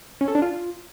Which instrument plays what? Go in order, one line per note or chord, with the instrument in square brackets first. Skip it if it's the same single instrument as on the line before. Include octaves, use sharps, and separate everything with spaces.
[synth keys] C#4
A4
D4
F4